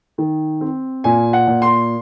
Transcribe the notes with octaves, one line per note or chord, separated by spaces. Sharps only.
D#3
C4
A#2 G#5
F#5
A#2
C6